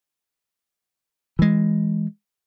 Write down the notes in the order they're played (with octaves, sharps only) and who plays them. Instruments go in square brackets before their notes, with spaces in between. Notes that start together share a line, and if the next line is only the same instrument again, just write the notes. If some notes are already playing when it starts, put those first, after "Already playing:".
[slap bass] E3 G#3